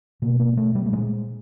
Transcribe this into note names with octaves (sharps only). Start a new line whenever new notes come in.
B2 A#3
A#3
B2 A3
G3
A3
A#2 G#3